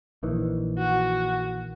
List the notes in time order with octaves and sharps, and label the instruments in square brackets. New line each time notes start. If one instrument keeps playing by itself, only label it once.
[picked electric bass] A#1 D#3 E3
[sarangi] F#4